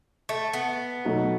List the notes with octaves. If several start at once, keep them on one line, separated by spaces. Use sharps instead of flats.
A3
B3
B2 F#3 A3 D#4